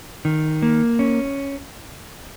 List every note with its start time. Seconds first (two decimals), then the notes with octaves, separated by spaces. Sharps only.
0.25 D#3
0.63 A#3
0.99 C#4